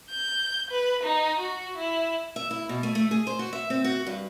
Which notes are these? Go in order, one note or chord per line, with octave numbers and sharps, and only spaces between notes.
G6
B4
D#4
F#4
E4
E5
E4
B2
A3
A3
G#4
C5
F#4
E5
C4
F#4
G2